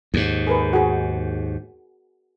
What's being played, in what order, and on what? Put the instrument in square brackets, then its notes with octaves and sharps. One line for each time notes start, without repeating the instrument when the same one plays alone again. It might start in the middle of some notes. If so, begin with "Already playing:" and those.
[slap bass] D#2 G#2
[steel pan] G#4 A#4 B4
F#4 G#4